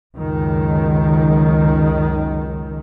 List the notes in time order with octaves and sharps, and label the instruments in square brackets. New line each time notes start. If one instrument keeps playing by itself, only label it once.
[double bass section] C#2 F#2 D#3